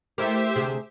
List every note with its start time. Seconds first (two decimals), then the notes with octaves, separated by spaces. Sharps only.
0.18 A3 E4 G4 A#4 C5 E5
0.56 D2 C3 G#4